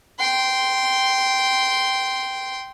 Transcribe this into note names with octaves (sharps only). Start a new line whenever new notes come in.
G5 C6